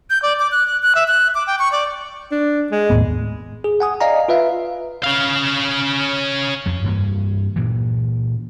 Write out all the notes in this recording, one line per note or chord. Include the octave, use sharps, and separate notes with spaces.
G6
D5
D6
F#6
F#6
F#6
E5
F#6
D6
G5
C#6
D5
D4
G#3
D#2 A2 B3
G#4
F#5 G#5 D#6
D5 D#5 F5 G#5 A#5
F4 B4 E5 F5
C#4 F5
F2 F3
G2 E3 A#3
A#2 E3